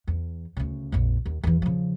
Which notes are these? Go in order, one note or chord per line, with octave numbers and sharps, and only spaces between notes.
E2
D2 C#3
A#1 F2
D#2
E2 E3
C#3 F3